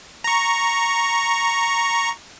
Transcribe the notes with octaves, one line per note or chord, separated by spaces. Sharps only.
A#5 C#6